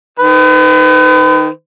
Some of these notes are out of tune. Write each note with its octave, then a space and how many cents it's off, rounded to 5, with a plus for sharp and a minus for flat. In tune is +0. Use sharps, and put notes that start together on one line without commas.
D#3 +0 B4 +40